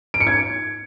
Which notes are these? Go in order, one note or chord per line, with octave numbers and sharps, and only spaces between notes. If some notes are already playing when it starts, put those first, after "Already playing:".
D7
C#7
G#6